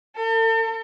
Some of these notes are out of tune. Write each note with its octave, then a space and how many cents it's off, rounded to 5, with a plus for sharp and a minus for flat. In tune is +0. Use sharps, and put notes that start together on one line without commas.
A4 +45